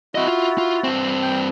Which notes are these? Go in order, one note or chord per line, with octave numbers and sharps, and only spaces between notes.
C4 E4 F#4 D#5
F4
F4
G2 C4
G5